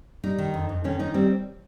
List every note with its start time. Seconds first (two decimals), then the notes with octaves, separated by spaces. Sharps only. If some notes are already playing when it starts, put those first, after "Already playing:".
0.23 G3 D#4
0.38 D#3
0.54 F2
0.69 F2
0.84 D#3 C#4
0.99 D#3 D#4
1.14 G3 C4